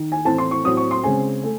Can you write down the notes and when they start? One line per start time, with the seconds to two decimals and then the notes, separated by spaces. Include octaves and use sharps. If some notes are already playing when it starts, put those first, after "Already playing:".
Already playing: D#3
0.12 G#5
0.25 A2 E3 A3 C4 A5
0.38 C6
0.51 C#6
0.64 A2 F#3 C4 D#6
0.77 C#6
0.91 C6
1.03 C#3 G#3 C4 G#5
1.44 A3